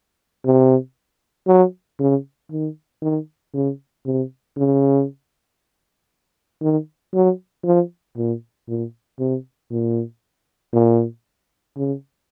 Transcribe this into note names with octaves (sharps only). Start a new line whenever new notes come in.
C3
F#3
C#3
D#3
D#3
C#3
C3
C#3
D#3
F#3
F3
A#2
A#2
C3
A#2
A#2
C#3